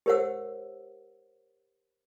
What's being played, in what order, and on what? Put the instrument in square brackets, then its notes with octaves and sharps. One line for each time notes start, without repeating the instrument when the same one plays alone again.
[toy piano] G4 A#4 C5 C#5 F#5 E6